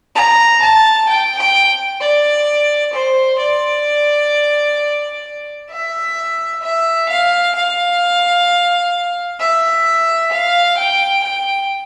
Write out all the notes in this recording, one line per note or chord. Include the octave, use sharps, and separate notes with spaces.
A#5
A5
G5
G5
D5
C5
D5
E5
E5
F5
F5
E5
F5
G5
G5